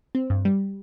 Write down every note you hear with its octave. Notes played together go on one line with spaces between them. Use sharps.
C4
G2
G3